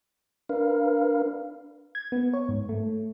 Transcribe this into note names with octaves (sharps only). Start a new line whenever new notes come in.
D4 A#4 B4 F5
G#6
B3
C#5
G#2
A3